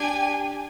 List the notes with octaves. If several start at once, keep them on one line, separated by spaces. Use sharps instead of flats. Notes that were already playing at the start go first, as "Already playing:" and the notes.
Already playing: D4 G4 G#5